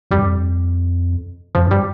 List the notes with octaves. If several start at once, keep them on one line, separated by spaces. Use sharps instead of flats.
F2 G3
G2
F2
F2 F3
G2 G3